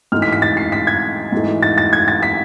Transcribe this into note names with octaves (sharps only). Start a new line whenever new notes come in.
G#2 E3 A3 F6
B6
B6
A6
C7
B6
G#6
G#2 E3 A3
A6
A6
G#6
A6
B6